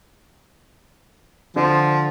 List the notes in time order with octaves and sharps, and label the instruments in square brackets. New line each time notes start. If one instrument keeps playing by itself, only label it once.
[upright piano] D3 [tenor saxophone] F3